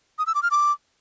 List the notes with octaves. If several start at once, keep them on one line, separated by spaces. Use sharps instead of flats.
D#6
E6
D6
F6
D6